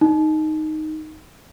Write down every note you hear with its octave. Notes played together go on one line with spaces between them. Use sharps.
D#4